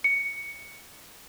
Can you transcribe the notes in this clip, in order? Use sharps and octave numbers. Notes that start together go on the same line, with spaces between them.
C#7